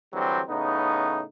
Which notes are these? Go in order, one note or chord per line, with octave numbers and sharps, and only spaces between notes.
D3 E3 F#3 G3 C4
A2 C#3 B3 D#4